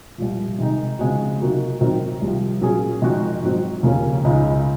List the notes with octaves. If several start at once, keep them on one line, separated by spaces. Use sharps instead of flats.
C2 A#2 F3
C3 D#3 G#3 D#4
C#3 F3 G#3 C4 F#4
C3 F#3 A#3 D#4 F#4
D#3 F#3 C4 D#4 A#4
C2 C3 F3
A#2 F#3 A#3 C#4 G#4
F2 D#3 G#3 D#4 F#4
G#2 F#3 C4
D#2 C#3 F3 A#3 C#4
C#2 C#3 G#3 D#4